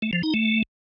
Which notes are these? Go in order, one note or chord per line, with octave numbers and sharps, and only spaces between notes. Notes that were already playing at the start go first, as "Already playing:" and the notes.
A3
F3
D#4
A3